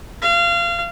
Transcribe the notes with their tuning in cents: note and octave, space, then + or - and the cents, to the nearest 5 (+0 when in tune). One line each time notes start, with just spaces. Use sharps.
F5 -25